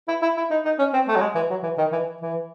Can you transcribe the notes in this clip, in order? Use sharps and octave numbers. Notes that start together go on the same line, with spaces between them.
E4
E4
E4
D#4
D#4
C#4
C4
A3
F#3
G#3
E3
F#3
E3
D#3
E3
E3